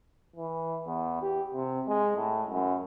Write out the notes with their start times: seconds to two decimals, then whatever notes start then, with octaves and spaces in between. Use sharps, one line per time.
0.36 E3
0.86 E2
1.22 G4
1.54 C3
1.88 G#3
2.17 A2
2.50 F#2